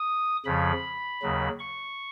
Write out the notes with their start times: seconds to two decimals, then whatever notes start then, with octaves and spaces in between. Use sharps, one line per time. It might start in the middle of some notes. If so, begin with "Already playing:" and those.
Already playing: D#6
0.45 F2 C#3 F3 B5
1.22 D#2 C#3 F#3
1.59 C#6